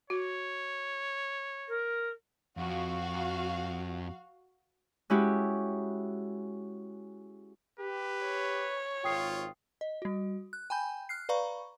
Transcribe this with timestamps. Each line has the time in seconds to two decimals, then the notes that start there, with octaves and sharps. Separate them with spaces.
0.10 F#4 C#5
1.68 A#4
2.57 F2 F#4 F5
5.10 G#3 C#4 E4 F#4 G4
7.80 G4 B4
8.24 C#5
9.04 G#1 F4 G5 D#6 C7
9.81 D#5
10.02 G3 F#4
10.53 F#6
10.70 G5 G#5 B5 G6
11.09 F6 F#6 C7
11.29 B4 D5 F5 A#5 B5 C#6